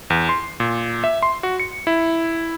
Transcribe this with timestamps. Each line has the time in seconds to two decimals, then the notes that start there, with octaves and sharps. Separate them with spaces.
0.10 E2
0.29 C6
0.60 A#2
1.04 E5
1.23 C6
1.43 F#4
1.60 C#7
1.87 E4